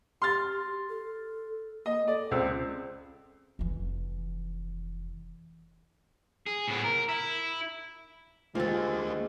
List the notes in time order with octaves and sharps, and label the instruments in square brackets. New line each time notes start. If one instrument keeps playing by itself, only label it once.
[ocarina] G4 [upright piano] C6 F6 A6
[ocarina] A4
[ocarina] A#3 [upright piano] D#5
[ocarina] A4 [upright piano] D5
[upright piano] C#2 C4 E6
[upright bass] F1 E3
[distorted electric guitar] G#4
A2 B3
A#4
E4
[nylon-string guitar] D2 [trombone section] G#3 [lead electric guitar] A#3 G4 [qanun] F4 A4